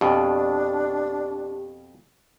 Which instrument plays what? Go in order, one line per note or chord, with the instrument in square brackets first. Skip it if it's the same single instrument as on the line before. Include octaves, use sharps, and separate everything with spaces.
[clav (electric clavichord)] F2 B2 [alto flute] D4 [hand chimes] G4